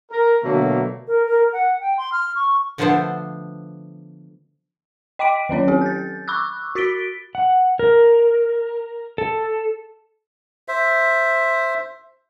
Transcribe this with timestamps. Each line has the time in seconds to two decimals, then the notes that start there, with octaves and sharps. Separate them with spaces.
0.11 A#4
0.43 B2 D3 F#3 A3 A#3
1.08 A#4
1.26 A#4
1.53 F#5
1.80 G5
1.98 C6
2.12 F6
2.36 C#6
2.78 D3 F3 A3 B3 D4 C5
5.19 D#5 G5 C6 D6 B6 D7
5.49 D#3 F#3 C#4 C#5
5.68 C4 G4 A4
5.82 G6 A6
6.28 B5 C#6 D6 E6 F#6
6.75 F#4 A6 B6 D7 G7
7.35 F#5
7.79 A#4
9.18 A4
10.68 C5 E5